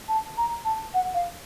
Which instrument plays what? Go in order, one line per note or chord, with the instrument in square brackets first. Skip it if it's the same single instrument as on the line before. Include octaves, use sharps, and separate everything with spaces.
[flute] A5
A#5
A5
F#5
F5